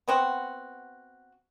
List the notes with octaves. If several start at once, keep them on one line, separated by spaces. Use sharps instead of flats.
B3 C4 F#4